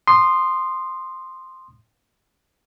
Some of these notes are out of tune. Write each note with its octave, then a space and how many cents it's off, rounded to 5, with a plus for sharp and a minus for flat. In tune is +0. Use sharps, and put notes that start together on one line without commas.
C6 +0 D#6 -25